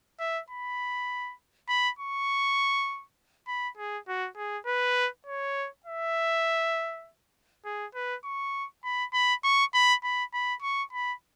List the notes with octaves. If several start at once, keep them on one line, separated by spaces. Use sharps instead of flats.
E5
B5
B5
C#6
B5
G#4
F#4
G#4
B4
C#5
E5
G#4
B4
C#6
B5
B5
C#6
B5
B5
B5
C#6
B5